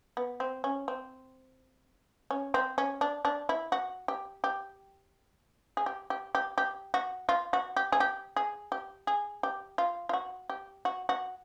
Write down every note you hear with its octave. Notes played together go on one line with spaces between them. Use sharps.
B3
C4
C#4
C4
C#4
C4
C#4
D4
D4
E4
F#4
G4
G4
G#4
G4
G4
G4
G4
F#4
F4
F#4
G4
G#4
G4
G#4
G4
G#4
G4
F4
F4
F#4
G4
F#4
F#4